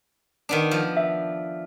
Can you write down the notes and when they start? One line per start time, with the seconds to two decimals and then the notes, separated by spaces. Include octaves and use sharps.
0.49 D#3 B3 D4
0.71 F3
0.97 E5